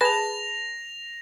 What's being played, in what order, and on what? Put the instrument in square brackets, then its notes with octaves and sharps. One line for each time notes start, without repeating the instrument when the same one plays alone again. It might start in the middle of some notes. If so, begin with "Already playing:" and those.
[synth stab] G#4 B4 A5 [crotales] A#6 F7